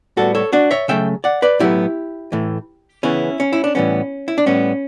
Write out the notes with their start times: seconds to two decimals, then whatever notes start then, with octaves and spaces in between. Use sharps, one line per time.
0.17 A2 G3 B3 F#4 A4
0.35 A4 C#5
0.53 D4 F#4
0.71 C#5 E5
0.88 C#3 F#3 A3 E5 G5
1.24 D5 F#5
1.42 B4 D5
1.60 A2 F#3 B3 E4 G4
2.32 A2 E3 A3
3.03 C#3 E3 B3 C#4 E4
3.40 C#4
3.53 E4
3.64 D4
3.75 A2 E3 G3 B3 C#4
4.28 E4
4.38 D4
4.46 A2 G3 B3 C#4